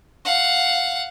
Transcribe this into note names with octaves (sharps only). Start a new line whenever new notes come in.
F5 F#5